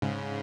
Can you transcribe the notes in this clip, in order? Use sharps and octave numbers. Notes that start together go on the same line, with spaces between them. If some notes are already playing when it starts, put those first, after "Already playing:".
G#2 C#3